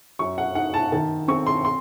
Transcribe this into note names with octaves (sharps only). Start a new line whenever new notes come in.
F#2 C#6
F#5
D#4 F#5
A5
D#3 A5
C4 C#6
C6
C6